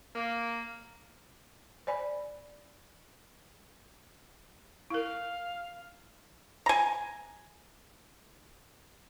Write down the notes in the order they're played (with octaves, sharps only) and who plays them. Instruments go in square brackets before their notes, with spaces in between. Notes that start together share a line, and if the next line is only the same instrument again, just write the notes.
[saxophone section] A#3
[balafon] C5 D5 G#5 B5
[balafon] E4 A#4 [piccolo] F5
[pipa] G#5 A#5